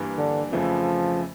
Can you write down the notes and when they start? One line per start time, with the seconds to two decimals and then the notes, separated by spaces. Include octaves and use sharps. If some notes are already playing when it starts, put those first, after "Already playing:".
Already playing: G2 E3 A#3 D4
0.18 D3
0.52 F2 C#3 E3 F3 A3 E4